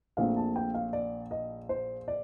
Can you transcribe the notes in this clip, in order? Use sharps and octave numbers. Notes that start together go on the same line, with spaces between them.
A#1 A#2 A3 C4 F5
A5
G5
F5
D5
D#5
C5
D5